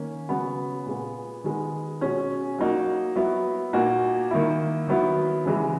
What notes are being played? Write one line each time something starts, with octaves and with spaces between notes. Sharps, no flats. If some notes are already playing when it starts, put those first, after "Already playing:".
Already playing: D#3 A#3 C#4
C#3 F#3 B3 F#4
A#2 G#3 B3
D#3 G#3 B3
B2 G#3 C#4
F#3 A#3 D#4 F#4
F#3 B3 E4
A#2 A#3 D#4 F#4
D#3 A#3 E4
D#3 F#3 B3 E4
C#3 E3 G#3